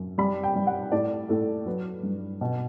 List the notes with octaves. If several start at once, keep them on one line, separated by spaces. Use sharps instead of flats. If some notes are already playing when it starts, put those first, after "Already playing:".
Already playing: F#2
G3 B5
G5
G3
F#5
A2 D5
A2 A4
F#3 B4
G2
B2